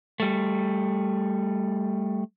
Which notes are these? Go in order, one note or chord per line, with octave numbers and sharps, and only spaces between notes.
G3 A3